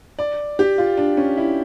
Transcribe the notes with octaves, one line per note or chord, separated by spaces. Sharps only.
D5
G4
F4
D4
C#4
E4